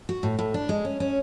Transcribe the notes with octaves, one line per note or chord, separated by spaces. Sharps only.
F#4
A2
A2
D4
G#3
C#4
C#4